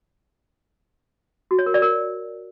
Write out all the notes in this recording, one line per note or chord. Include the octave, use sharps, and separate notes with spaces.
F#4
C#5
A#4
D5
A#4